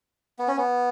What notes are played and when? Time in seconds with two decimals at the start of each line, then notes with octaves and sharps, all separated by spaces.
0.39 B3
0.48 C#4
0.58 B3